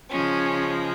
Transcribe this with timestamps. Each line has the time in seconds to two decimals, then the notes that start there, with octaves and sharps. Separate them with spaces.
0.11 C#3 F3 G#3 C#4